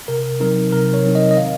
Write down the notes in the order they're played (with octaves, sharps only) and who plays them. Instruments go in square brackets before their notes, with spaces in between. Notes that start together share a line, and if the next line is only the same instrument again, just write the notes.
[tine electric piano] C3 A#4
F#3 C4 D#4 A#4
C3 A#4
C#5
F#3 C4 D#4
D#5
D#5
D#3 F5